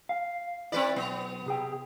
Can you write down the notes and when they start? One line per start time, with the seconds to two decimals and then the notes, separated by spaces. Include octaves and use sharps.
0.09 F5
0.72 C4 E4 B4 D5
0.96 B1 B3
1.46 C3 G#4 G5